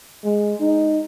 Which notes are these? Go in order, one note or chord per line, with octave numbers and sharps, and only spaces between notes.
G#3
D#4